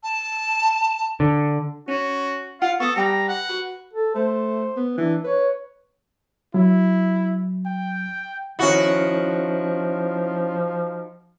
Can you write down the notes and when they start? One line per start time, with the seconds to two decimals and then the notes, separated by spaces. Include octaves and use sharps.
0.03 A5
1.20 D3
1.88 C#4 F#4
2.62 F4 F5 F#5
2.80 B3 A4 C#6 D#6
2.96 G3 B4 G5 A5 A#5
3.28 F#5
3.49 F#4 B4
3.93 A4
4.15 A3 C5
4.76 B3
4.97 E3 D4
5.24 B4 C#5
6.54 F#3 E4
7.66 G5
8.59 D#3 F3 C#4 E4 F#4